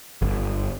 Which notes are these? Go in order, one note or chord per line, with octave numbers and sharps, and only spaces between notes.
G1